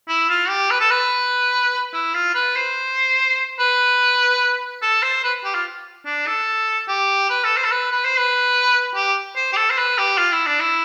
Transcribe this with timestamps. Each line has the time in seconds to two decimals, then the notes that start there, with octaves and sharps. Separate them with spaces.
0.08 E4
0.29 F4
0.49 G4
0.71 B4
0.80 A4
0.90 B4
1.94 E4
2.14 F4
2.35 B4
2.56 C5
3.59 B4
4.82 A4
5.03 C5
5.24 B4
5.44 G4
5.55 F4
6.06 D4
6.27 A4
6.88 G4
7.30 B4
7.44 A4
7.57 C5
7.64 A4
7.71 B4
7.92 B4
8.05 C5
8.19 B4
8.96 G4
9.36 C5
9.53 G4
9.57 A4
9.70 C5
9.78 B4
9.98 G4
10.18 F4
10.32 E4
10.47 D4
10.61 E4